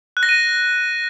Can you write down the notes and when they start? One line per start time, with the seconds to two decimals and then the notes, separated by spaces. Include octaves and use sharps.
0.17 F#6
0.23 A#6
0.29 D#7